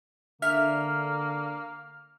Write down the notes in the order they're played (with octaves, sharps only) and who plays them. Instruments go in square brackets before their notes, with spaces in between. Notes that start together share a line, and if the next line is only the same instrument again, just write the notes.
[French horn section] D3 [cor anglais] A#3 [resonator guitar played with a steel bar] E5 [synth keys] F6